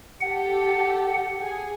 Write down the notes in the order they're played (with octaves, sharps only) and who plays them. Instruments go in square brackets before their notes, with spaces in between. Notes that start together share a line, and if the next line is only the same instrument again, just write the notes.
[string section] G4 A4 [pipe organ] F#5
[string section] G#4